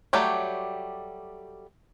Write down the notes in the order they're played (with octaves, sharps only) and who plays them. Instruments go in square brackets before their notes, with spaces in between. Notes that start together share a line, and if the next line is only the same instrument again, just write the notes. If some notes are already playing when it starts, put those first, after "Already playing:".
[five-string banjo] F#3 G3 A3 G4 C#5